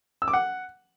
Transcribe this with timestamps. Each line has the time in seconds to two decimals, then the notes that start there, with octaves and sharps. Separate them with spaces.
0.22 E6
0.28 D6
0.33 F#5